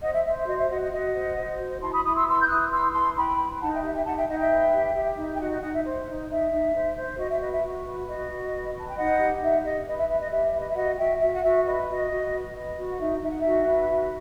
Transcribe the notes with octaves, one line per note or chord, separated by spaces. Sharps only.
C5 D#5 F#5
E5
C5 E5
E5
F#4 D#5
E5
F#4 D#5 F#5
D#5 F#5
F#4 D#5 F#5
C5
C5
F#4
E4 A5 C6
B5 D#6
E4 B5 D#6
C6 E6
B4 C6 E6
G6
E4 D#6 F#6
B4 C6 E6
E4 A5 C6
E4 G5 B5
B4
D#4 F#5 A5
E5 G5
G4 E5
E5 G5
D#4 F#5 A5
E5 G5
D#4 D#5 F#5
E5 G5
B4
G4
G4
D#4
G5
F#4 D#5 F#5
D#5 F#5
D#4 D#5 F#5
E5
C5
D#4
D#4 E5
D#4
C5
C5
F#4 D#5
E5
B4 D#5
E5
F#4
B4
F#4 D#5
F#4
B4
B4 A5
G5
D#4 D#5 F#5
G4
D#4 E5
G4 D#5
B4 D#5
E5
B4 E5
D#5
G4 E5
B4
D#5
E5
F#4 D#5 F#5
F#4 E5 G5
F#4 E5
F#5
F#4 E5
B4 D#5
F#4 D#5
F#4
B4
B4 D#5
F#4
F#5
D#4 E5
D#4 E5
F#5
F#4 E5
B4
F#4